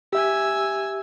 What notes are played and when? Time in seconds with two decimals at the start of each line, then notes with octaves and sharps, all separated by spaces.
0.13 G4 E5 G#5 E6